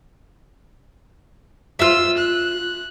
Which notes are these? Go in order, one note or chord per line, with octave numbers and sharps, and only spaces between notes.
F4 E5 E6
F#6